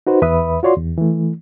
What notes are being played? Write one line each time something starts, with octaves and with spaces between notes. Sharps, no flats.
D#4 F#4 B4 C5
E2 B4 E5 B5 D#6
F4 F#4 C#5 D5 C6
E2
E3 A3